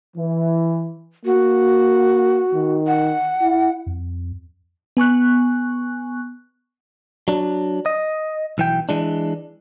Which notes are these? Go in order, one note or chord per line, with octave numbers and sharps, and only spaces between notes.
E3
A#3 F#4
D#3
F#5
E4
F2
B3 G#5 C#6 F#6
F#3 D4
D#5
B1 E3 G5
E3 G#3 D4